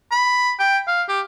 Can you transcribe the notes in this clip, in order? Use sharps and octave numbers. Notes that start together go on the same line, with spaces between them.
B5
G5
F5
G4